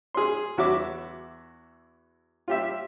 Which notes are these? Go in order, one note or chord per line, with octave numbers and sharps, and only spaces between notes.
G#4 C6
E2 F#4 E5 D6
F4 G4 E5